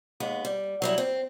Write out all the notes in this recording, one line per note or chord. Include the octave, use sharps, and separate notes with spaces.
D#2 G#3 B3
G3
F#3 G3 E4
C4